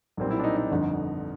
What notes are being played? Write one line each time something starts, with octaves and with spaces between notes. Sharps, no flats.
B1 A#2 G3 C4
E4
D4
D#4
D#4
G1 F2 D3